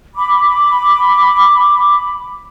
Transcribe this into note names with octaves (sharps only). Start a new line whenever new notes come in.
B5 D6